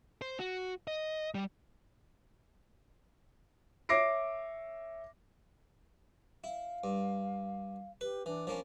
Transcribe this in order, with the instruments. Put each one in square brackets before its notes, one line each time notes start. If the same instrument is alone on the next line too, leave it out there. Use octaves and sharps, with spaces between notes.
[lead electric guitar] C5
F#4
D#5
G3
[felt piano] C#5 E5 D6 A#6 C7 D7
[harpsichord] E4 [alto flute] F5
[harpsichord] G2
[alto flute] G4 [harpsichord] B4
[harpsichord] E3 [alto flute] D4
[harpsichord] F3 A#3 C#4